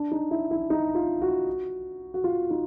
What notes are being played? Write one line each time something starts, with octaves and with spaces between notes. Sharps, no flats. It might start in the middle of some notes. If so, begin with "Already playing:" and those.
Already playing: D4
D#4
E4
E4
D#4
F4
F#4
F#4
F4
D#4